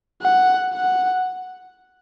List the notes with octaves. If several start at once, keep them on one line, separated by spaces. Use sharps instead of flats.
F#5
F#5